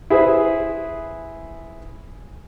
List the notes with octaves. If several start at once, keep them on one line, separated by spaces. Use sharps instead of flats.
E4 G#4 B4 C5